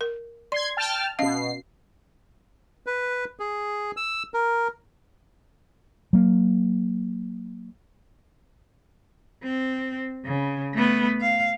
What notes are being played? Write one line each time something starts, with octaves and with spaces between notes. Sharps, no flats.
A#4
D5 C6 G#6
G5 A5 F6
B2 C#4 D#5 F5 C7
B4
G#4
E6
A#4
F#3 A#3
C4
C#3
A3 B3
F5